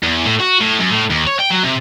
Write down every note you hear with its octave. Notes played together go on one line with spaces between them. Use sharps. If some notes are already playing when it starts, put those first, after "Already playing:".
E2
A2
F#4
A2
F#2
A2
D#2
C#5
G5
F#3
C3